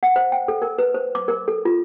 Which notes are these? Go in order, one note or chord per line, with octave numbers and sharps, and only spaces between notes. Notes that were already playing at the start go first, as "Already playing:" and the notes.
F#5
C5
G5
A4
A#4
B4
C5
D6
A#4
A4
F4